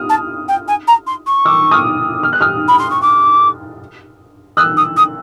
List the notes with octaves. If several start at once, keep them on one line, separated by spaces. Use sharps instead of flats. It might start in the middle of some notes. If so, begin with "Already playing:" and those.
Already playing: D#6 F6
A5
G5
G#5
A#5
C6
C#6
D6 E6
D#6 F6
F6
F#6
D#6 F6
B5
C6
C#6
D6
D#6 E6 F#6
D#6
D#6